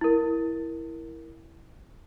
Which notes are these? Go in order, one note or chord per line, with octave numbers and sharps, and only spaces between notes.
E4 A#4